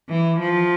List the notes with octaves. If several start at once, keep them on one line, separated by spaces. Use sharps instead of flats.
E3
F3